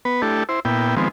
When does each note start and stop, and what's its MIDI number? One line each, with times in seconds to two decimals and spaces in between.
0.05 0.22 59
0.05 0.22 71
0.22 0.43 57
0.22 0.43 62
0.22 0.43 64
0.22 0.43 67
0.22 0.43 69
0.49 0.60 64
0.49 0.60 72
0.65 0.95 46
0.65 0.95 59
0.65 0.95 64
0.65 0.95 79
0.97 1.08 51
0.97 1.08 53
0.97 1.08 56
0.97 1.08 59
0.97 1.08 60